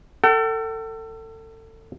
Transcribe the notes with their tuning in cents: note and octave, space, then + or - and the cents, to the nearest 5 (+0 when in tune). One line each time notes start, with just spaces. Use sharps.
A4 +30 G5 -45